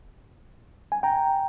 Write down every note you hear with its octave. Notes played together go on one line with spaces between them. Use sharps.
G#5
G5 A#5